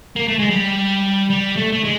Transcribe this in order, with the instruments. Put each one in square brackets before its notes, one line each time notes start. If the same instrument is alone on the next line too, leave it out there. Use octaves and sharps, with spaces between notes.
[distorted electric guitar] A#3
A3
G#3
G3
G3
A3
A3
G#3